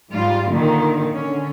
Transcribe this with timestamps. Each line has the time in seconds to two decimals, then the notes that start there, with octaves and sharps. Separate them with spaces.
0.11 G#2 G3 F4
0.50 A#2 D3 D#3
1.12 D3 C#4